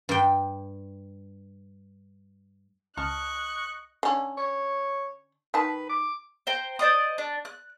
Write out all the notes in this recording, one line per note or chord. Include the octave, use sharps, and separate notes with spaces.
G2 G5
C#2 D#5 A5 C#6 F6 F#6
D3 C#4
C#5
D#3 B4 A5
D6
C5 G5 A#5
C5 D5 D#5 D#6
D4
F#6